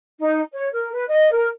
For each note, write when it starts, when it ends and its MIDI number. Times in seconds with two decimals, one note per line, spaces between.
0.20 0.40 63
0.53 0.68 73
0.73 0.90 70
0.92 1.04 71
1.08 1.30 75
1.31 1.47 70